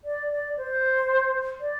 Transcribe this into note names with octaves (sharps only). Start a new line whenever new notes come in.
D5
D5
C5
D5